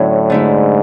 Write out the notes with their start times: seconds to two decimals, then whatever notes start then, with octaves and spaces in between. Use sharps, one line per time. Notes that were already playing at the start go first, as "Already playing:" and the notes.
Already playing: A2 D3 F#3 C#4 E4
0.30 G#2 D3 A3 E4